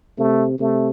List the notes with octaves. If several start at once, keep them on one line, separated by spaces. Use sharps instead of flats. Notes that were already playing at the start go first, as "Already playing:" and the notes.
C3 A3
C3 A3